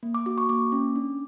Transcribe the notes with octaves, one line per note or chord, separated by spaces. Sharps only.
A#3
D6
F#4 D6
C#6
A#3 D6
C#4
D4